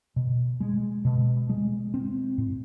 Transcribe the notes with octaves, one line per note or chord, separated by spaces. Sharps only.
B2
G#3
B2
G#3
C4
A2